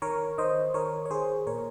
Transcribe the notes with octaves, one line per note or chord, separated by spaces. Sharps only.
D#3 A#4 C#5
D#3 C5 D#5
D#3 A#4 C#5
C#5
D#3 G#4 C5
A#2 A#4 C#5